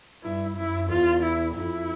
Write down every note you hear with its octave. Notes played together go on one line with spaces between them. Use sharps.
G2 E4
F#2 E4
E2 F4
E4
F2 E4